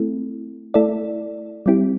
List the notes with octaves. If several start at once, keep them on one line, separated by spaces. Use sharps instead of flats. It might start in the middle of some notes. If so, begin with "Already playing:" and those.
Already playing: A3 C4 E4 A4
A3 E4 A4 D5
G3 C4 E4 G4